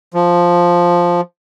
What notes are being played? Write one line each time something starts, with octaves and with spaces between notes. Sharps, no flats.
F3